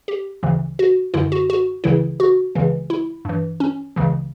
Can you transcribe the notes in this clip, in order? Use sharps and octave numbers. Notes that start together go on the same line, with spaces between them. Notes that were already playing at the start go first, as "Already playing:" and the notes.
G4
D2 C#3 E3
F#4
F#2 D3 E4
F#4
F#4
C#2 C#3 E3 E4
F#4
C#2 C#3 E3
E4
G2 E3
C#4
C#2 C#3 E3